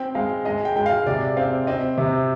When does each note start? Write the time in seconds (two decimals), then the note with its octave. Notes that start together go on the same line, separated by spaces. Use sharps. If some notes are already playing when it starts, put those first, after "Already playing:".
Already playing: C4 G5
0.15 G#3 F5
0.45 G#3 D#5
0.65 G5
0.76 G#3 G5
0.86 F5
1.06 C3 D5
1.37 C4 F5
1.67 C4 D#5
1.98 C3